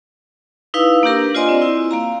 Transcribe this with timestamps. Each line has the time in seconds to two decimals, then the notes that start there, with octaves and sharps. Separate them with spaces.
0.74 D#4 E4 B4 F5 E6
1.03 A#3 D4 G4 A#4
1.35 F4 C5 D5 D#5 G#5 C6
1.49 C4
1.62 E4
1.91 A#3 F5 A#5